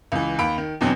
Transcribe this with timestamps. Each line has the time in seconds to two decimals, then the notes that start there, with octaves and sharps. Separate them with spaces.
0.12 C#2 E3
0.39 D#2 B5 D7
0.58 D#3
0.81 E2 B2 D3 F#3 C4